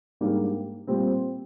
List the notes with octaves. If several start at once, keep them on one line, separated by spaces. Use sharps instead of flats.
G#2 G3 A#3 D4 G4
A#2 G3 C4